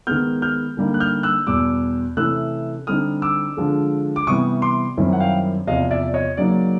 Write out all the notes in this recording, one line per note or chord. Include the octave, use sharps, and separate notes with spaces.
D#3 G#3 B3 F6 G6
F6 G6
D3 G3 A#3 D#4
F#6
F6 G6
E6 F#6
E2 B2 G3 D6 E6
C3 E3 A3 C#4 E4 E6 F#6
D3 G3 C4 D#4 D#6 F6
D6 E6
D3 F3 G#3
D6
C3 E3 G3 B3 C#6 D#6
C6 D6
F#2 D#3 G3 C4 E4
F#5
F5 G5
E2 C3 F3 D#5 F5
D5 E5
C#5 D#5
C#3 F#3 A#3 D#4 D5